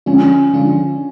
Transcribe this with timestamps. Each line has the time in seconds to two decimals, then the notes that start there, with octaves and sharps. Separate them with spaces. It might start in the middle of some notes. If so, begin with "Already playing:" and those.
0.06 D3 F3 G#3 C#4 D4 F4
0.53 D3 F3 G#3 D4 F4